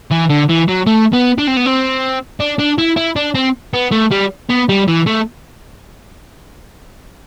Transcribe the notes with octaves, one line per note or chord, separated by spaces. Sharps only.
E3
D3
E3
F#3
A3
B3
D4
C4
B3
C4
D4
D4
E4
E4
D4
C4
B3
A3
G3
B3
G3
E3
A3